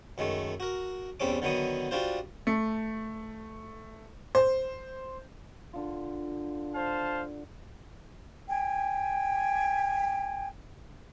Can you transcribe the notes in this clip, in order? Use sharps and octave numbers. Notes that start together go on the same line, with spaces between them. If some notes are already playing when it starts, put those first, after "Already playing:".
F#2 D#3 G#3 A3
F#4 A#4
A1 E2 G3 C4 C#4 D6
D3 D#3 F#3 B3 D#6
G3 D4 F4 F#4 C5
A3
C5
D3 F4
C5 F5 A5
G5 G#5